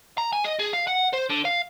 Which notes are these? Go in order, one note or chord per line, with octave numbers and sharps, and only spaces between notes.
A#5
G#5
D#5
G#4
F5
F#5
C5
D3
F5